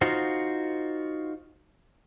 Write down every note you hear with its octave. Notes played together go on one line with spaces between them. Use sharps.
D#4 F4 F#4 C5